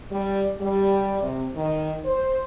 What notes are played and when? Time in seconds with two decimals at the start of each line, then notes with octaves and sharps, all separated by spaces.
0.10 G3
0.60 G3
1.21 C3
1.55 D#3
2.05 C5